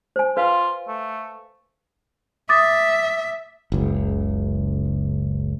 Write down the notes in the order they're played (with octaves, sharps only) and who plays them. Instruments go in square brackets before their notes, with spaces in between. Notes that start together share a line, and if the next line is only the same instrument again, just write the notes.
[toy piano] C5 G#5
[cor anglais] F4 [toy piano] B4 F5
[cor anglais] A3
[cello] E5 [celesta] D6 D#6 A6
[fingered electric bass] F#1 C#2